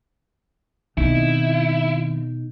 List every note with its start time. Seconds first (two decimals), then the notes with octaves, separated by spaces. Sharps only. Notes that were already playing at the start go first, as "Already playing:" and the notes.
0.97 B2 D#3 C4 D#4 E4